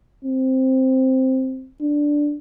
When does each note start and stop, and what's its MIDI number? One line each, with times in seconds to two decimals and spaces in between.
0.25 1.70 60
1.81 2.37 62